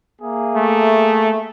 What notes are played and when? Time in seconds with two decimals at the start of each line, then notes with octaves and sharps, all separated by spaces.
0.21 A#3 G#4 E5
0.55 A3